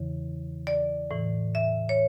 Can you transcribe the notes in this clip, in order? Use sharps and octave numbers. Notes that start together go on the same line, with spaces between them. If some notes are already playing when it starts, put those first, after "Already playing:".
Already playing: E2 C#3 E3
D5
A2 E3
E5
C#5